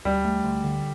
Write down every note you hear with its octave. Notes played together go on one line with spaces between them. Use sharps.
D2 G3
A3
D2
D3